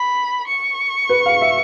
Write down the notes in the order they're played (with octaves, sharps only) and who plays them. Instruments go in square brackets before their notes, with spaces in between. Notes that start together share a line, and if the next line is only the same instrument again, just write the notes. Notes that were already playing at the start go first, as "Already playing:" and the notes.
Already playing: [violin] B5
C#6
[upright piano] B4
F5
E5